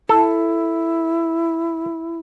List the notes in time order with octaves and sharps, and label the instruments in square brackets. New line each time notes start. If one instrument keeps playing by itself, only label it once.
[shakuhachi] E4 [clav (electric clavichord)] A4